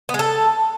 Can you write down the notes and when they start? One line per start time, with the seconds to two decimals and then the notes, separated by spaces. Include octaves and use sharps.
0.09 B3
0.14 G#3
0.19 A4